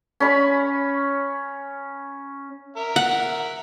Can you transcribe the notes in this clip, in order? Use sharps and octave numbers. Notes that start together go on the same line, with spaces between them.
C#4 B5 C#6
A#4 E5
F#5